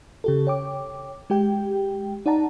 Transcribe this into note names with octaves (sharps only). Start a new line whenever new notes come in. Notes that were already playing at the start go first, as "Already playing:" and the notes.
C#3 G4 A4
C#5 G5 D6
G#3 G4 G5
D#4 D5 F#5 A5 A#5